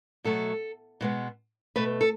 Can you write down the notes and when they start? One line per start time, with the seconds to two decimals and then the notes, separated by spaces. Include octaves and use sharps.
0.24 B2 F#3 A3 A4
1.01 B2 G#3 B3
1.76 B2 A3 B4
2.01 A4